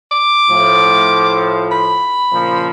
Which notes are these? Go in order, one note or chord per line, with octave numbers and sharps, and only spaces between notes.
D6
A2 F3
B5
A#2 C#3 F3